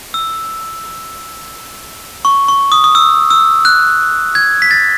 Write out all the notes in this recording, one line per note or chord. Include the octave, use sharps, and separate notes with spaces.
E6
C#6
C#6
D#6
D#6
E6
E6
F#6
G#6
B6
A6